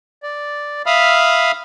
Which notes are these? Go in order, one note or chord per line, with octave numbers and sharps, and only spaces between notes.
D5
E5 F5 B5 D#6 F6